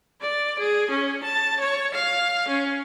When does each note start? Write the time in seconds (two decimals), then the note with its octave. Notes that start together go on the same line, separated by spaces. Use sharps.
0.22 D5
0.59 G#4
0.90 C#4
1.24 A5
1.60 C#5
1.94 F5
2.48 C#4